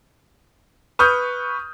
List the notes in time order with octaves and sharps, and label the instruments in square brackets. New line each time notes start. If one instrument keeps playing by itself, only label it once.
[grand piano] B4 C#6 D#6 F6 G6